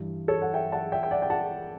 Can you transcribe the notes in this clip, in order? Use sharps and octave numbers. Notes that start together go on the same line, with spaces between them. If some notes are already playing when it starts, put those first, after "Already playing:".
Already playing: G2 E3
A4 C#5
F#5
E5 G5
F#5 A5
E5 G5
G5
D5 F#5
G5
F#5 A5